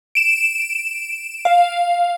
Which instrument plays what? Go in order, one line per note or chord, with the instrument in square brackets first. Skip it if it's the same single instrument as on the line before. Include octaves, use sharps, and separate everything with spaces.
[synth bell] D7 E7
F5